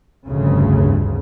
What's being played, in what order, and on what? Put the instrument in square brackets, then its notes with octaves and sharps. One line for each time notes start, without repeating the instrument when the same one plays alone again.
[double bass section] F1 D2 G2 C#3